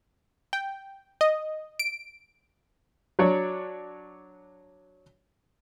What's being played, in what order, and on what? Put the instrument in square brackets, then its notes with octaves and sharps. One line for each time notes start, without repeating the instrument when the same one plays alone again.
[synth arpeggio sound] G5
D#5
D7
[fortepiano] F#3 D4 C#5 D5